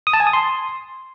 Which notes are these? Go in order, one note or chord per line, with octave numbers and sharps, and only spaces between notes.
D#6
A5
G#5
D#6
C6